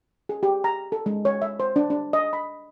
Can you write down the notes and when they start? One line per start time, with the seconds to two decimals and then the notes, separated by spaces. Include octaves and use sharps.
0.29 G#4
0.43 G4
0.64 A#5
0.92 A4
1.06 G#3
1.25 C#5
1.42 E5
1.60 C5
1.76 D4
1.90 D4
2.13 D#5
2.33 B5